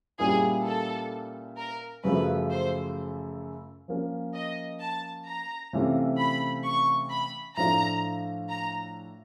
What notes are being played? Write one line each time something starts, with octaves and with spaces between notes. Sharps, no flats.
A#2 G3 A#3 C#4 E4 G#4
A4
A#4
F#2 C#3 F3 A3 B4
C5
F3 A#3 C#4
D#5
A5
A#5
C3 E3 A3 C#4 F4
B5
C#6
B5
A2 F3 A3 D4 F4 A#5
A#5